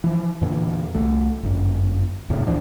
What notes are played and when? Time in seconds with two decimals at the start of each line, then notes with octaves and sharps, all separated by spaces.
0.04 E3 F3
0.41 E2 A#2 D3 E3
0.95 C2 A3
1.43 G1 F#2
2.29 D1 E2 A2 C#3
2.47 C#2 E3 F3 D4